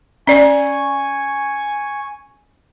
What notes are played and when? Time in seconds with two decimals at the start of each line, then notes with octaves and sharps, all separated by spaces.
0.27 C#4 D5 G#5 C#6